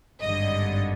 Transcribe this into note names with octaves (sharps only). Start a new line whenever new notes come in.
G#1 G2 D3 D#5